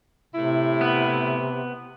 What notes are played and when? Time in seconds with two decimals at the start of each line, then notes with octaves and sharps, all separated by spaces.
0.34 A2 C3 E4
0.81 B3